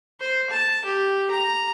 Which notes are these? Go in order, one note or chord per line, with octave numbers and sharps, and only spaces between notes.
C5
A5
G4
A#5